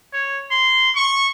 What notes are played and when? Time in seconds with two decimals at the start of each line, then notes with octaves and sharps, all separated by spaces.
0.13 C#5
0.50 C6
0.95 C#6